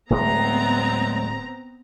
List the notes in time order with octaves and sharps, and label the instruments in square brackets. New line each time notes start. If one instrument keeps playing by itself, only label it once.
[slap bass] D1 A2 G#3 [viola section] B3 C4 A#5